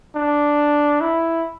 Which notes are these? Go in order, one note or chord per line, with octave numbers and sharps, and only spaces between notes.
D4
E4